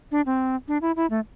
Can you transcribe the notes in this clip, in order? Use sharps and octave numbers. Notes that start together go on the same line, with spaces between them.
D4
C4
D4
E4
E4
A3